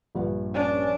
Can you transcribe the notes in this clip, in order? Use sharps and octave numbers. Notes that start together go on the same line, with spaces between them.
A#1 G2 F#5
C#4 D4